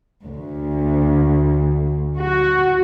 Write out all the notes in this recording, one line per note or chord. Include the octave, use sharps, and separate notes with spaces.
D2
F#4